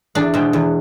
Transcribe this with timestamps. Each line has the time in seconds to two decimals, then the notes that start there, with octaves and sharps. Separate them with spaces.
0.15 E2 D4
0.34 B2 G#3 C4
0.53 E2